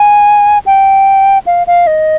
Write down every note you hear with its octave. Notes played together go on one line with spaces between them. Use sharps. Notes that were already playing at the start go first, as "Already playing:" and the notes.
Already playing: G#5
G5
F5
F5
D#5